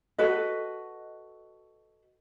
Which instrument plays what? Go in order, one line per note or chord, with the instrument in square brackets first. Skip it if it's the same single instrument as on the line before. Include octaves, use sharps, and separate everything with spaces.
[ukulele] F#4 A4 B4 D#5